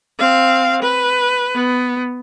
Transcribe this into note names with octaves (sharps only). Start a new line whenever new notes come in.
C4 F5
B4
B3